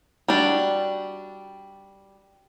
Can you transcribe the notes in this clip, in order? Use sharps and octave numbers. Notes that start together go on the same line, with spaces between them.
G3 D4 F#4